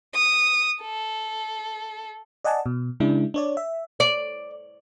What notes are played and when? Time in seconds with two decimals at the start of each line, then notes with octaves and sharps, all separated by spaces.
0.15 D#6
0.82 A4
2.44 D5 D#5 F#5 G#5 A5
2.66 B2
3.00 C#3 G#3 D4 E4
3.34 D4 C#5 D5
3.57 E5
4.00 D5